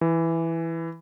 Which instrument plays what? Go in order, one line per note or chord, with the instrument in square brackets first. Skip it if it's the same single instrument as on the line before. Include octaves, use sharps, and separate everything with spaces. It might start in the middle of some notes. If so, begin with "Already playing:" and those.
[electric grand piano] E3